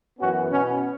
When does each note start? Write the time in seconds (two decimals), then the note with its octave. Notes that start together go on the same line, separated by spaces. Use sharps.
0.19 F#2 E3 B3 C#4 F#4
0.51 B2 B3 C#4